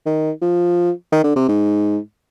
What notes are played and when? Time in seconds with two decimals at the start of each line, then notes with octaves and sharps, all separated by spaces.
0.06 D#3
0.42 F3
1.12 D#3
1.24 D3
1.36 C3
1.49 G#2